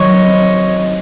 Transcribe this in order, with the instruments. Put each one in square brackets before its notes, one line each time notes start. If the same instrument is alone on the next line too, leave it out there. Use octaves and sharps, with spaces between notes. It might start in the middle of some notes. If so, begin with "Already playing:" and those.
Already playing: [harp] D#3 F#3 [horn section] C#5 D#5
[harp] C4